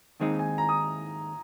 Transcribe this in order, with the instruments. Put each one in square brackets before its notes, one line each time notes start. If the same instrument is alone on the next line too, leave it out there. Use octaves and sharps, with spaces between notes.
[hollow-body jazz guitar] D#2 D#3 G#3 C4 D#4
[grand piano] G#5
A#5
D#6